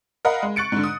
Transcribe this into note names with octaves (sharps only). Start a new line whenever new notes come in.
A#4 D#5 F5 F#5 B5
G#3
C#6 F#6 A6 C#7 D7
G#2 D3
D#6